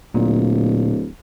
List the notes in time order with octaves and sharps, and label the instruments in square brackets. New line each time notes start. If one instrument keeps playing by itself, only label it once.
[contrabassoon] D1 [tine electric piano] A#2